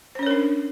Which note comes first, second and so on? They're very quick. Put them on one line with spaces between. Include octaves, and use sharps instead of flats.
C5 C#4 C#5 A#4 D4